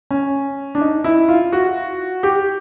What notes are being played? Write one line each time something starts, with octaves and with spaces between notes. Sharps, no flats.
C#4
D4
D#4
E4
F4
F#4
G4